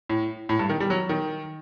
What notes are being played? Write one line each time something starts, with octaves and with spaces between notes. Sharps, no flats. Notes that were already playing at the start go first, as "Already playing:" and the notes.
A2
A2
G2
D#3
G3
F#3
D#3